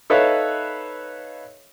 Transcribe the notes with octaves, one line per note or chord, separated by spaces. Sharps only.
D#4 A4 B4 C#5 E5 F5